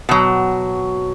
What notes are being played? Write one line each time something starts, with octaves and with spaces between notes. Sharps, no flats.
B2 F#3